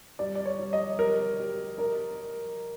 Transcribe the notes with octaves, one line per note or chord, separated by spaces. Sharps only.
G3 D5
D5
C#5
G3
D#5
G4 A#4
G4
A#4